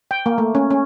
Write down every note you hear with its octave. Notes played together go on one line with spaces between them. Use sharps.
G5
A#3
A3
C#4
C#4